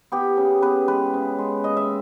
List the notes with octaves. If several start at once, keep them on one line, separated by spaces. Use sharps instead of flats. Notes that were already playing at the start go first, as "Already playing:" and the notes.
B3 G4
C#3
B3 B4
G#3 B4
C#3
G#3
A#3 D#5
E5